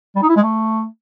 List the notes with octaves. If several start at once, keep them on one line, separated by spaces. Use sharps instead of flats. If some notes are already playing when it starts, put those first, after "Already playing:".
G3
D#4
E4
G#3
A3